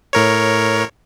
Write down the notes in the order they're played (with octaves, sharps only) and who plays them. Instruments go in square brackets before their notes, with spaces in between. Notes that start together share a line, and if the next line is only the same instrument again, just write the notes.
[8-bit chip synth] A2 A#4 C#5